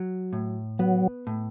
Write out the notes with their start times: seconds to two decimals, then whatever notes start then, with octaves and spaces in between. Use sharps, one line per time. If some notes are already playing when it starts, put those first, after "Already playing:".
Already playing: F#3
0.33 A2
0.79 F#3 B3
1.27 A2